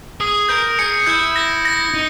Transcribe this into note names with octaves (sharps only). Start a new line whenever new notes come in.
G#4 D#6
A#4 G6
G#4 C#7
E4 G6
A#6
A#6
D#4